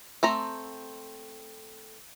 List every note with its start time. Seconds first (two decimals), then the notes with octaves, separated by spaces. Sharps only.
0.23 A3 C4 A#5